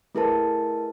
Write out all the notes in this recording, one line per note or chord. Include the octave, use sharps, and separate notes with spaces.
A3 E4 G#4 A#4 B4 A5